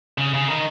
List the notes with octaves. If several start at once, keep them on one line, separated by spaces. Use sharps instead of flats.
C#3
C#3
D#3